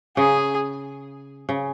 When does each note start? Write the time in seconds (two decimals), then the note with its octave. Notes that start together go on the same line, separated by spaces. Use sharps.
0.17 C#3 G#4
1.49 C#3